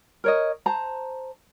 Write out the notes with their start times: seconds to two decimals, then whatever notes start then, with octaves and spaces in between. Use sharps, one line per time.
0.24 A#4 C#5 D#5
0.66 C5 A5 A#5